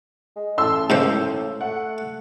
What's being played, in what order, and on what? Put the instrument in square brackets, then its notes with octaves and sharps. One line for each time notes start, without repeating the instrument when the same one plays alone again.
[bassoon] G#3
[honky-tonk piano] A1 C6 E6 [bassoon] A4
[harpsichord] G#2 C#3 C5 [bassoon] A#3
[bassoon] A2
[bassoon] A3 [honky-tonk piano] F#5